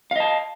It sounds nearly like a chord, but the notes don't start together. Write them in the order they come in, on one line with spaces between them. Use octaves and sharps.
F5 D#5 A5